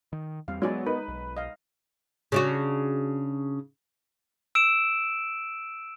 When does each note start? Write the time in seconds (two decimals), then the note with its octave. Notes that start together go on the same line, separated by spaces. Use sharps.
0.13 D#3
0.48 E2 G3 C4 F5
0.62 F#3 G#3 B3 D5 G#5
0.86 D#4 B4
1.08 B1
1.37 D#5 F5
2.32 C#3 D4 F#4
4.55 E6 D7 E7